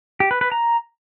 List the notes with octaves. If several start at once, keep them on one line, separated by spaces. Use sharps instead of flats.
G4
B4
B4
A#5